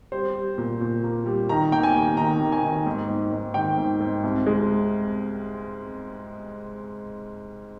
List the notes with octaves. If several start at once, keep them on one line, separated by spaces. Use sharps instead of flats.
G3 C5
G3
A#2
A#2
A#3
G3
D#3 A#5
A#3 G5
G#5
D#2
D#3 A#5
A#3
G#5
D#3
G#2
G#2
G#2
D#3 G5
G#2
G#2
C2
G#3